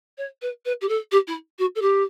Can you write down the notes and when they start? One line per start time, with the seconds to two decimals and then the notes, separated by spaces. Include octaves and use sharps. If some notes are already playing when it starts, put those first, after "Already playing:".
0.18 C#5
0.42 B4
0.65 B4
0.81 G4
0.88 A4
1.12 G4
1.27 E4
1.59 F#4
1.75 A4
1.81 G4